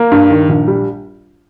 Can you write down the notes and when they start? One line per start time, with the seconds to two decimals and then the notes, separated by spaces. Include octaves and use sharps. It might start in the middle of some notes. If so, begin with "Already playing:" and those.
Already playing: A#3
0.12 G2
0.30 D#3
0.49 A#1
0.68 G3